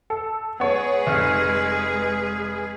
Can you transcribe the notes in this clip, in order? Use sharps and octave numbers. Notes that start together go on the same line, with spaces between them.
A4
G#3 B3 G#4 B4 C#5
F1